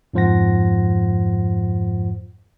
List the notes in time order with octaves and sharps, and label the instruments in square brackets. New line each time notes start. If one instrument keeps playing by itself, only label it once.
[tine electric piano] F2 G#2 F3 C5 F#5 A#6